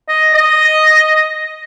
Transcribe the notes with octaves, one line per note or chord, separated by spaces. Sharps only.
D#5
D#5